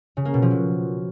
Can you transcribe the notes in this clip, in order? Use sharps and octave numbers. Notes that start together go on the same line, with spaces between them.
C#3
A#3
B2
F3
F#3